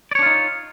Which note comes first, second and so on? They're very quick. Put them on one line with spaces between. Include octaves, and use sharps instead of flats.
D5 C#5 D4 F4 D#4